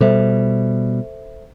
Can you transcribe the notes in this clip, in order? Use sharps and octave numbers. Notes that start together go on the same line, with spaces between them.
B2 G3 A4 C5 E5